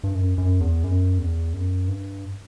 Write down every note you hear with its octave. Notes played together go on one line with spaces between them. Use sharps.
G2
F#2
F#2
E2
F#2
E2
F#2
G2